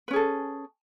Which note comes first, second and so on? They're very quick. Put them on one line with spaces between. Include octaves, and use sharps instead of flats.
B4 C#4 G#4 A4